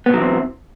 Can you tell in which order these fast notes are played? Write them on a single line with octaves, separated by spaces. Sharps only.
B3 B2 F#3 E3 C4